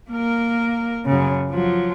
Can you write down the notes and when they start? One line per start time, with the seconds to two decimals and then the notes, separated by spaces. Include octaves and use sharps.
0.10 A#3 A#4
1.06 F#2 C#3
1.51 F3 F#3